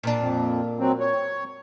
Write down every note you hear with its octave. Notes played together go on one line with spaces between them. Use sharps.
A#2 D4
F2
F#3 C4
C#5